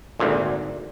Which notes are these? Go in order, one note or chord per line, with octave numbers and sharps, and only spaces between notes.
G#1 D2 A#2